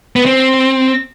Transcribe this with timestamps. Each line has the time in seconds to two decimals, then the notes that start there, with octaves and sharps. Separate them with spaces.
0.16 B3
0.26 C4